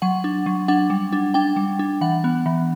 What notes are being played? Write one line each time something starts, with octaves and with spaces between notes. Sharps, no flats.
F#3 F#5
D4
F#3
D4 F#5
G3
D4
D4 G5
G3
D4
E3 F#5
B3
E3